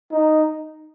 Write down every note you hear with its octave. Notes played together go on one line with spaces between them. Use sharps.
D#4